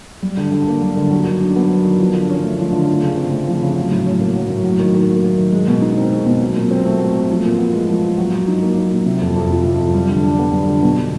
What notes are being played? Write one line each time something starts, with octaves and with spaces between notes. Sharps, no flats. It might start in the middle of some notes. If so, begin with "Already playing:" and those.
G3
D3
D3
A#3
G3
D3
F#3
D#3
D4
B3
F#3
D#3
F3
D3
C#4
A3
F3
D3
F3
C#3
C4
A3
F3
C#3
F#3
A2
C#4
A#3
F#3
A2
F#3
D#3
D#3
A#3
F#3
D#3
G#3
B2
D#4
C4
G#3
B2
F#3
A#2
C4
A3
F#3
A#2
F3
A#2
B3
G#3
F3
A#2
F#3
A#2
D#4
A#3
F#3
A#2
C3
F2
F2
F3
C3
F2
G3
D3
D4
B3
G3
D3
B2